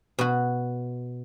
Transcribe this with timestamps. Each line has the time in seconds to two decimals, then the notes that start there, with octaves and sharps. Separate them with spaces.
0.19 B2 F#4